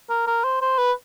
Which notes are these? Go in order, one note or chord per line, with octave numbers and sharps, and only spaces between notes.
A#4
A#4
C5
C5
B4